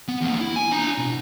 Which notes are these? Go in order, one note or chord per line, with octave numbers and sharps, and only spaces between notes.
B3
E2 A#3
E4
G#5
D4 A#5
B2